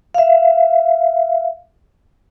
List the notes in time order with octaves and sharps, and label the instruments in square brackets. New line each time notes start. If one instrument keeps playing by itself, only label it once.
[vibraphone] E5 F5